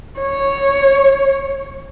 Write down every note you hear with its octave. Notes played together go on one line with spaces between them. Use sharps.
C#5